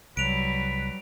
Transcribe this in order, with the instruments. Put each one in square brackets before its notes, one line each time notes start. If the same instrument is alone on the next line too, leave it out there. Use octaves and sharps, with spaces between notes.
[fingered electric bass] C2 [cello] F#3 G3 [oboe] B4 [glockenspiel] D7 F7